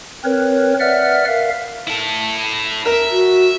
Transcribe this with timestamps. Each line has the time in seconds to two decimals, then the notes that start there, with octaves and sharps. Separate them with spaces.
0.24 C4 A#4 B4 C#5
0.80 B4 D5 E5 F#5 F6
1.27 A#4 E5 F5
1.87 E4 A4
2.86 A#4 E5
3.11 F#4